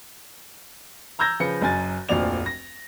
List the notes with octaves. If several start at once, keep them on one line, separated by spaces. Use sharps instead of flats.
A#5 E6 G6 G#6 A#6
C#3 F3 B4 C#7
F#1 F#2 G#5 A6
F1 D2 A#2 F3 D5 F7
A#6